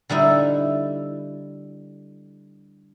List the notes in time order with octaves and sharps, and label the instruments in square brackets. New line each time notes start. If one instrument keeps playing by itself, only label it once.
[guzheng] D3 G3 D#4 E4